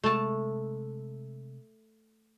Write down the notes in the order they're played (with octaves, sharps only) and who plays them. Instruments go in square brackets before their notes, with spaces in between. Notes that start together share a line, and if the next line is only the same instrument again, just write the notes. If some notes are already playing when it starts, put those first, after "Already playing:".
[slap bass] C3 G#3 [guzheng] A3 A5